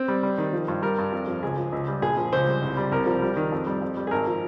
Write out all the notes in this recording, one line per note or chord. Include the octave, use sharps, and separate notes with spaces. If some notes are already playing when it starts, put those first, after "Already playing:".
Already playing: C4
G3
G3
D#3
F3
G2
G3 A#4
G2
F2
F3
C#2 G#4
F3
C#2
G3
A#1 G#4
F3
C#2 C5
G3
C2
G3
C2 A#4
F3
G3
D#3
F2
G3
F2
G3
G#4
G#1 A#4
F3